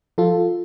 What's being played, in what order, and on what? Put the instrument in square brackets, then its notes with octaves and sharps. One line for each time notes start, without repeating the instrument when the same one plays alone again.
[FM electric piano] F3 F4 A4